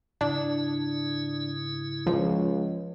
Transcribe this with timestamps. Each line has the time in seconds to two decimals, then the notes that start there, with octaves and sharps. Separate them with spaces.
0.21 G#2 C#3 D4 E4
2.07 C#2 F3